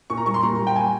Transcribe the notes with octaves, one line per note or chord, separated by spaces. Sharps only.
A#2 C#6
A#5
G3 C#6
C6
A#2 A#5
G3
G5
G#5